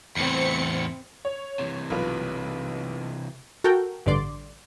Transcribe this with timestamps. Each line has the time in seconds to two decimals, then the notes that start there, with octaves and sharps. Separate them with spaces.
0.17 E2 A2 C4 C#7
1.25 C#5
1.59 C3 E3
1.90 B1 F4 B4
3.64 F#4 A4 A#4 G5
4.06 A1 G2 D3 D5 C6 D6